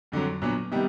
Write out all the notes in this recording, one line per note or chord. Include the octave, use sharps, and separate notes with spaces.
F2 D3 F#3
A#2 F#3 B3 D4
C3 D#3 G3 B3